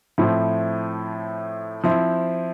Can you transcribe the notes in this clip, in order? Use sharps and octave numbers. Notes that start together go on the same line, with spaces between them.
A2 F3 C4 E4
F3 C4 E4